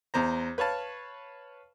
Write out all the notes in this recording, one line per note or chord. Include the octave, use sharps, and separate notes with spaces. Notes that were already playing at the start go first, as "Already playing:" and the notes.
E2 C5 A#5
B4 C#5 F5 A5